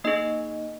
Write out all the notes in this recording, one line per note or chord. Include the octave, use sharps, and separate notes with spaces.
A#3 D#4 G#4 D#5